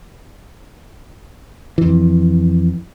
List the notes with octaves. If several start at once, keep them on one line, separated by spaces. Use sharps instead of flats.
F2 E3